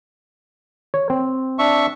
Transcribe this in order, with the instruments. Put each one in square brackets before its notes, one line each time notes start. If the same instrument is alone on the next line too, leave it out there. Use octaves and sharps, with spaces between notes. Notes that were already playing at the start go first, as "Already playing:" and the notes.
[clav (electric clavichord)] C#5
C4
[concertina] D4 E5 C#6